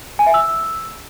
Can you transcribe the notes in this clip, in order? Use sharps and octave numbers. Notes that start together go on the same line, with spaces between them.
G#5
E5
E6